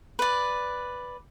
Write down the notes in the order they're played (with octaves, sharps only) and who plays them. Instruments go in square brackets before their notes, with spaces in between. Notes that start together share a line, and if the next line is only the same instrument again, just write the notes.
[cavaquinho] B4 D5